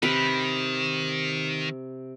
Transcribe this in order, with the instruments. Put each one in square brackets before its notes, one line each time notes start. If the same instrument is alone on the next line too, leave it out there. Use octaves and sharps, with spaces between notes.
[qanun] C3 B4 [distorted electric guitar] D#3